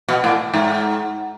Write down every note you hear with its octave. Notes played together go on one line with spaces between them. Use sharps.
B2
A2
G#2